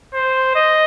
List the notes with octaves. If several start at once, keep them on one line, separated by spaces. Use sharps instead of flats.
C5
D#5